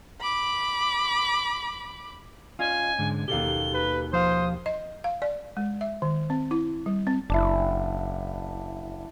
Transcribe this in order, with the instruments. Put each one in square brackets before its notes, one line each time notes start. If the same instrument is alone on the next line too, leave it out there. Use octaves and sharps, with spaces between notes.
[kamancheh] B5 D6
[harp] C#4 D#5 [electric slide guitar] F4 [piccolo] G#5
[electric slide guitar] G#2 D3 G#3
[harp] D#2 B2 [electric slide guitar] G4 A4 F5 [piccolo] G7
[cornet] B4
[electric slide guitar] F3 F5 [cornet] C5 [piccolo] D#6
[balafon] D#5
F5
D5
G#3
E5
D#3
C4
E4
G3
C4
[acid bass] F#1 [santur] D4 E4